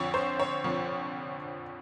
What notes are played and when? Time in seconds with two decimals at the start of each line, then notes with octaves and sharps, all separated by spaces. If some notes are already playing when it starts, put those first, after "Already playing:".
Already playing: F2 D3 F3 C#5
0.14 C5
0.40 C#5
0.64 F2 D3 F3